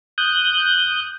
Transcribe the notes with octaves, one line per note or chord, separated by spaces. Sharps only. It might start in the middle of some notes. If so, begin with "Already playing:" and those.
D#6 F#6 G6